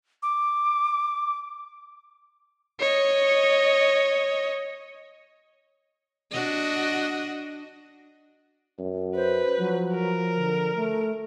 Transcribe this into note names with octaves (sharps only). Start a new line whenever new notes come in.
D6
C#5 D#5
D4 F#4 D#5
F#2
B4 C5
F3 F#3
A#4
D3
A3